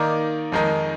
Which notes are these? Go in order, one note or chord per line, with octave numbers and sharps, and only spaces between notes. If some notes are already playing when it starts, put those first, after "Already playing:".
Already playing: D#3 A#3 D#4 A#4 D5
F2 D#3 G#3 D#4 A#4